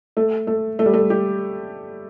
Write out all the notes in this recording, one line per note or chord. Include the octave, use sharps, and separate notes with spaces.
A3
A3
A3
G3
A3
G4